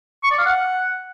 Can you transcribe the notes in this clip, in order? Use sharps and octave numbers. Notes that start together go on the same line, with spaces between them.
C#6
D5
F5
F#5